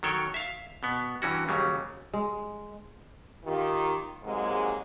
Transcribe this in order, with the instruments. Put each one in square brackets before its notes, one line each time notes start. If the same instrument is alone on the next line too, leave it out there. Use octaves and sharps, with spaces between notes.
[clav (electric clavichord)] D#3 F#3 A4 C#5 G5
E5 F5
B2 B3
G2 E3 C#4 F#4
D#2 C#3 F#3 G3
[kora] G#3
[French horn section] D#3 F4 G4
G#2 C3 F#3 G#3 A#3 G#4